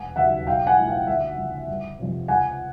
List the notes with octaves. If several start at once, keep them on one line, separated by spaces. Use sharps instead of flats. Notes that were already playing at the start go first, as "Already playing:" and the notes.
Already playing: E1 F#5 G#5
D#2 C#3 F#3 E5 F#5
B1 F5 G5
F#5 G#5
A2 F3
F5 G5
D2 E5 F#5
C#3 F3
G1
F2 C3
C#2 F#5 G#5